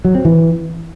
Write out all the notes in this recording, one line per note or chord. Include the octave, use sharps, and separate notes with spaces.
F#3
C4
E3